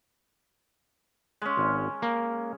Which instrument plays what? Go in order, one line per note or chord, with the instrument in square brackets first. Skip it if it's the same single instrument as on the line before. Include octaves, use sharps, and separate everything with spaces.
[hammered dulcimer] G#3 C#4
[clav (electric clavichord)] G#1
A#3